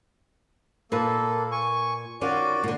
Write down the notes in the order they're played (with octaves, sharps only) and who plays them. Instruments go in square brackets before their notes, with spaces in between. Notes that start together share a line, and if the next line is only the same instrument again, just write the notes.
[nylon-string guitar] A#2 B4 [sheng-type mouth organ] A#3 A4
[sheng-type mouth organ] G#5 C#6
[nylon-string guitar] D#3 C#4 F4 [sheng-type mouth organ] F#4 D5
[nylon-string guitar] A#2 D3